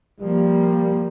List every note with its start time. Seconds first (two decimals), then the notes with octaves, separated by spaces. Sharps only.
0.20 F3 G3 A#3